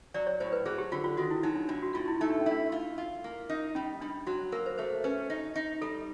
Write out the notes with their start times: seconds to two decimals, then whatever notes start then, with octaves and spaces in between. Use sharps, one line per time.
0.14 F#3 D5
0.27 C#5
0.40 A2 C5
0.52 B4
0.66 F#3 G#4
0.78 G4
0.92 D3 F4
1.04 F4
1.17 D#3 F#4
1.31 E4
1.43 F#3 D#4
1.56 D4
1.68 A2 D4
1.82 F#4
1.94 A2 F4
2.08 E4
2.21 A3 D#4
2.30 D4
2.40 C#4
2.46 E4
2.51 D4
2.72 F4
2.98 F4
3.24 A#3
3.49 D#4
3.75 G3 C#4
4.01 G3 D4
4.27 F#3 F#4
4.52 A#3 A#4
4.66 C5
4.78 A3 C5
5.04 C#4 B4
5.30 D#4
5.56 D#4
5.81 G3 A4